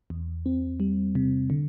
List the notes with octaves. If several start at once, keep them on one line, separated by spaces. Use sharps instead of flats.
E2
C4
G3
C3
D3